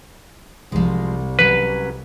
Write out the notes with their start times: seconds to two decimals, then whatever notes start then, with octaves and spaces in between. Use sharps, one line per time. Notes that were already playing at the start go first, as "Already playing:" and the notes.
0.72 C2 F3 G#3
1.39 F#3 G3 C#4 B4